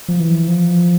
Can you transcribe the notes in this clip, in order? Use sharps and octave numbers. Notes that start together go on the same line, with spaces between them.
F3
E3
F3